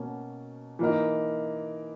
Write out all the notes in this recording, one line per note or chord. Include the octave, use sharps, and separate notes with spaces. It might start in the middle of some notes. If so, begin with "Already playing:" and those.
Already playing: B2 A#3 C#4
E3 A#3 D#4 A#4